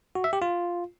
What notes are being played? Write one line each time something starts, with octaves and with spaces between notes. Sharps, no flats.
F#4
E5
G4
F4